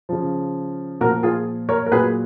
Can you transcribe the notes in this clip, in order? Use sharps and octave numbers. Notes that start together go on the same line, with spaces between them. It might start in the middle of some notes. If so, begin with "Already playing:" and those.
C#3 F3
A#2 F3 F#4 A#4
F4 G#4
A#4 C#5
A#4
A#2 F#3 G#4 B4